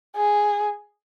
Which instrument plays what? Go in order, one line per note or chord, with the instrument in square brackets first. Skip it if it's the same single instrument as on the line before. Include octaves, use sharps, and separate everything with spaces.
[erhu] G#4